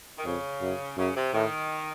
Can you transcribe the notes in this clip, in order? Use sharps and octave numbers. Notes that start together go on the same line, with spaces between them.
D#3
F2 C#3
F#2
F#2 C#3
C3
A2 D#3